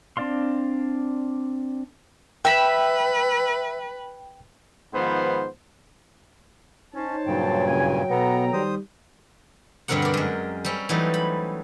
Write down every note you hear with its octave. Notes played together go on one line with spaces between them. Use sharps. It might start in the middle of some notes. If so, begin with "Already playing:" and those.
C4 D4 D5 F5 C6
B4 E5 G5 B5
G#2 D#3 F3 B3 B4 C5
C#4 D#4 C5 C#5 A5
G2 A#2 C#3 F#3 G5
F#1 G#5
B2 B3 A4 B4 A#5
D#3 G3 C5 D#6
G2 B2 D3 C4 A#4 F#5
A#4 D5
F#2 G#3
G3 C4 C#4
E3 F#3 G3 A3 D#4
B5